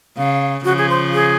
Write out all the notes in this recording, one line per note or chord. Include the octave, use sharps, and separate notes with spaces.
C#3 F5
C#3 F3 F#4
G#4
C5
G#4